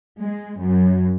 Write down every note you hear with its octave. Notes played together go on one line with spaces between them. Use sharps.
G#3
F#2